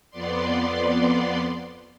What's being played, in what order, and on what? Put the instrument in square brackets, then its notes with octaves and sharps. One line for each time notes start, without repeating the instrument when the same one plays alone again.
[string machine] F2 B3 D5 C6